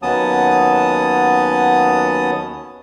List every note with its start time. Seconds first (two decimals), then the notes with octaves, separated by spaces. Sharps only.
0.02 D#2 F#3 B3 C#4 A5 D#6